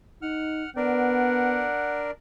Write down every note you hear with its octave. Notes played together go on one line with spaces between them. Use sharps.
D#4 F#5 F6
B3 D4 A#4 D5 F#5